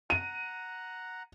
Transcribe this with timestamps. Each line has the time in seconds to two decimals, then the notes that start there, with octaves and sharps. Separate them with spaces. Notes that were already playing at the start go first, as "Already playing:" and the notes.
0.10 F#5 A#5 F#6 D#7